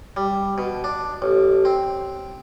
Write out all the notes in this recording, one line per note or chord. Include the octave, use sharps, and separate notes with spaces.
G3
B2
D4
A1
C4